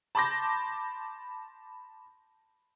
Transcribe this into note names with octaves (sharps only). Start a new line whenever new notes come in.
A5 B5 C6 D6 G6 A#6